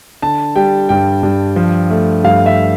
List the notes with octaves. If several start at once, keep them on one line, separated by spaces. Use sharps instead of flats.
D3 A5
G3 G5
G2 G5
G2
F3
A3
G2 F5
E5